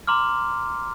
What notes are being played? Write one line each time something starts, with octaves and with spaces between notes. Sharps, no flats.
A#5 C6 D6 F6